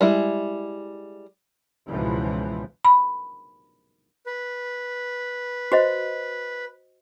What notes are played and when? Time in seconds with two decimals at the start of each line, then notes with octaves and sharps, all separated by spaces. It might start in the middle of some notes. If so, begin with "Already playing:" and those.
0.01 G3 G#3 E4
1.88 C#2 G#2 B2 E3 F3
2.85 B5
4.26 B4
5.72 F#4 C5 D#5